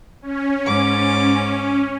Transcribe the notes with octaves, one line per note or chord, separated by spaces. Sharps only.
C#4
G#2 D6